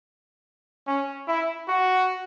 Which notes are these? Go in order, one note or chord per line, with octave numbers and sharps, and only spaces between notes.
C#4
E4
F#4